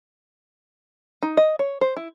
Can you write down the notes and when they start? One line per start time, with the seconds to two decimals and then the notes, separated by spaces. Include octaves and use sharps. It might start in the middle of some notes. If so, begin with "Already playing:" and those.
1.23 D#4
1.37 D#5
1.59 C#5
1.81 C5
1.97 E4